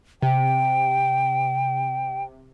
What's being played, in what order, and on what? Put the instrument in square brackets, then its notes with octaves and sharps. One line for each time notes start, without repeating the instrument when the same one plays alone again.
[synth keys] C3 [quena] G5